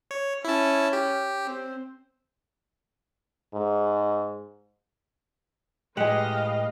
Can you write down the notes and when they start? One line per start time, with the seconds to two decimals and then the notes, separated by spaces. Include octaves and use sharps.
0.11 C#5
0.45 C#4 E4 A5
0.93 G4
1.45 C4
3.54 G#2
5.97 A2 G#3 G4 B4 D#5 F5 F#5